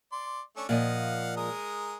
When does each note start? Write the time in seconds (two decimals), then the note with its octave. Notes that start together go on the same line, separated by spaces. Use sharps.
0.12 D5 C6
0.57 A3 C#4 D4
0.69 A#2 F3 D#5 F5 F#5
1.37 G#3 A#4 D#6